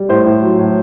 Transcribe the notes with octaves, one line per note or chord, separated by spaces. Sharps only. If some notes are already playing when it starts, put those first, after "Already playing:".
Already playing: G3
A2 C5
A2
F#3
A2